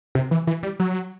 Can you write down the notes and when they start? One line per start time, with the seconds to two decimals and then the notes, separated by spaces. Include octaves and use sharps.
0.15 C3
0.31 E3
0.47 E3
0.63 G3
0.80 F#3